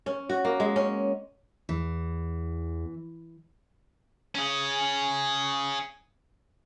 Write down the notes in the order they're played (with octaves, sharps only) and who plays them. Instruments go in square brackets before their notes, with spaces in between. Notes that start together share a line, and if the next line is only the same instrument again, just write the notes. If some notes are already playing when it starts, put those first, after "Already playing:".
[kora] C#4
F#4
A#3
G#3
C#4
[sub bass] E2 [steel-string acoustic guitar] E3
[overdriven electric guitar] C#4 G#4